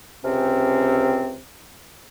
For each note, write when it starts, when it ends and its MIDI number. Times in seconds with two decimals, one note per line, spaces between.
0.24 1.39 37
0.24 1.39 48
0.24 1.39 60
0.24 1.39 61